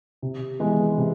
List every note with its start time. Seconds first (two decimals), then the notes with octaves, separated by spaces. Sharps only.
0.22 C3
0.60 E3 G#3 B3
0.98 C3